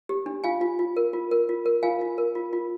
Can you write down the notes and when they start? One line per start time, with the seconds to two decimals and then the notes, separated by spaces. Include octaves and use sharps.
0.09 G4
0.26 D4
0.44 F4 F5 G#5
0.61 F4
0.79 F4
0.97 A#4
1.13 F4
1.31 A#4
1.49 F4
1.66 A#4
1.83 F4 F5 G#5
2.01 F4
2.18 A#4
2.35 F4
2.53 F4